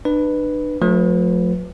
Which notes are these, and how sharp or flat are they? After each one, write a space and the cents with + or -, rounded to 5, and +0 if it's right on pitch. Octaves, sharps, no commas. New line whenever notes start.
D4 +40 B4 +0
F3 +45 A3 -5 B4 +0